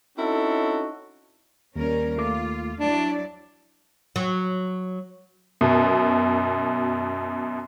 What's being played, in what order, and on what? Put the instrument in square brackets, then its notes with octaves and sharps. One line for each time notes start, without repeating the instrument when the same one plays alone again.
[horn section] C4 C#4 D#4 E4 F#4 A4
[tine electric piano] D#2 [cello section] G3 C#4 A#4
[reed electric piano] A3 D6 [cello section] F4
[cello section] F#3 E4 D5 [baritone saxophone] D4
[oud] F#3
[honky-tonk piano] F#2 B2